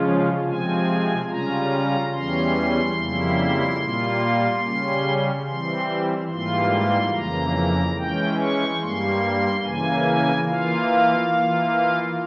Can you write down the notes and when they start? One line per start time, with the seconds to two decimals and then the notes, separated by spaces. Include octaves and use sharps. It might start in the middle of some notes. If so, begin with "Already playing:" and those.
Already playing: C#3 F3 G#3 C#4 F4
0.46 C3 F3 G#3 C4 G#5
1.29 C#3 G3 C#4 F4 A#5
2.13 E2 E3 G3 C#4 C6
2.97 F2 C#3 G3 A#3 E4
3.80 A#2 G3 A#3 F4
4.64 C#3 G3 C#4
5.47 E3 G3 C4 C6
6.31 G#2 E3 G3 A#3 F4 C6
6.73 C6
7.14 F2 C#3 E3 A#3 A#5
7.97 E3 G#3 C#4 G5
8.40 C#6
8.81 G2 G3 A#3 C6
9.65 C#3 E3 A#3 G#5
10.49 E3 A#3 F4 F5
11.32 E3 A#3 F4